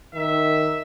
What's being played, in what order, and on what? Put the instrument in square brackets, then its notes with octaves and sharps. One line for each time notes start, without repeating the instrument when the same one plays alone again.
[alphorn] D#3 [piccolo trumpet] E5